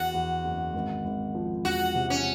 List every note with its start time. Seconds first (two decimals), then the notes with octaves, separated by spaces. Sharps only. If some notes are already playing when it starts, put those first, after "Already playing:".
Already playing: E2 F#4
0.14 E2
0.44 F#1
0.74 G#1
1.05 G#1
1.35 F3
1.64 E1 F#4
1.95 C3
2.10 C#4